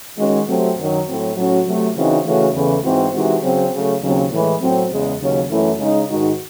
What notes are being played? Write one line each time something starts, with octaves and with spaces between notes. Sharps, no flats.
D#3 G#3 C#4 F#4
C3 F#3 A3 C4
F#2 D#3 F#3
A2 F#3 C4
A2 F#3 C#4 F#4
C3 F#3 A3
C#3 E3 C4 D#4 F#4
C#3 E3 A3 C#4 F#4
E2 C#3 E3 A3
G#2 E3 C4 F#4
C3 E3 G#3 D#4 F#4
C#3 F#3 C4
C#3 F#3 A3
D#2 C#3 F#3 C4
A2 E3 G#3
A2 F#3 C4
E2 C#3 G#3
D#2 C#3 F#3 C#4
F#2 E3 A3 C#4 E4
C#3 G#3 D#4
G#2 D#3 G#3 D#4 F#4